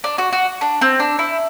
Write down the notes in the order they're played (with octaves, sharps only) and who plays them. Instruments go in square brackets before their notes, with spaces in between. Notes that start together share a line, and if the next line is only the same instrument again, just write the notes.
[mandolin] D4
F#4
F#4
D4
C4
D4
E4